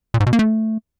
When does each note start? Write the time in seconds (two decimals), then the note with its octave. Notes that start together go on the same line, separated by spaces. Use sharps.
0.14 A#2
0.20 G#2
0.27 B2
0.33 A#3
0.39 A3